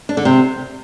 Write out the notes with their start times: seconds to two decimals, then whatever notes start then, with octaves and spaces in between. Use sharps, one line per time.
0.09 D4
0.17 D3
0.25 C3